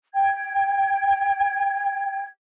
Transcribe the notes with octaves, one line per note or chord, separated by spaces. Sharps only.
G5 G#6